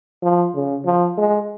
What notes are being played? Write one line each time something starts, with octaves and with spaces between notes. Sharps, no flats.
F3
C#3
F3
G#3